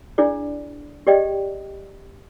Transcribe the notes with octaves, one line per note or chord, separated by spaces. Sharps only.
D4 E4 G#4 D5
G4 G#4 D5 D#5 G5